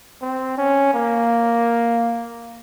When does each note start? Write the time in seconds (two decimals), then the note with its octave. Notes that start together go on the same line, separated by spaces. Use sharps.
0.22 C4
0.58 C#4
0.94 A#3